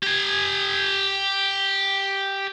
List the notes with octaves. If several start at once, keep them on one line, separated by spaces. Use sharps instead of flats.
G4 G#5